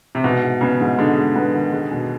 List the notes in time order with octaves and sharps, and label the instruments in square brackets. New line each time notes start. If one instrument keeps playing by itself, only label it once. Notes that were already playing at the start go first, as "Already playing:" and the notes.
[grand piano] C3
[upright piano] G#2 [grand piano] B2
[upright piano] G#2
[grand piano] C#3 [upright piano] B3
[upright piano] G#2
[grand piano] D3 [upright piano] G#3
[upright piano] G#3
B3
D#3
G#3
B2